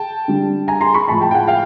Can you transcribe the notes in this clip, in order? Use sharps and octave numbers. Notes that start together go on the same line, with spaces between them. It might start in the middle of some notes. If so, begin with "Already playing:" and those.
Already playing: G5 A5
D3 G3
G#5 A#5
A#5 C6
B5 C#6
A2 F3 G#3 A5 B5
G5 A5
G5
F#5 G#5
F5 G5